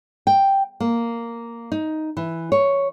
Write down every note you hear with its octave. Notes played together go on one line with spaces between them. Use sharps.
G5
A#3
D#4
E3
C#5